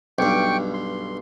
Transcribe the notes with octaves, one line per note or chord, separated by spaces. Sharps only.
B1 G2 G5 C#6 D6
C6